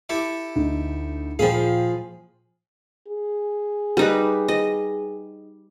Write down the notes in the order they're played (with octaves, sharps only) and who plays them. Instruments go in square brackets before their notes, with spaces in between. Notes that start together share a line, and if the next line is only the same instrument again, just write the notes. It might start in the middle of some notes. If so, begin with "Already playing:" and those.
[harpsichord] E4 G4 A4
[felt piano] D2 D#4
[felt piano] A#2 G5 [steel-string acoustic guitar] F3 G#4 [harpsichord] F5 B5
[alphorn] G#4
[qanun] G3 D#4 B4
D#5